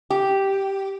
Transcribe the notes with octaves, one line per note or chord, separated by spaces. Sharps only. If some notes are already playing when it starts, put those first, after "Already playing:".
G4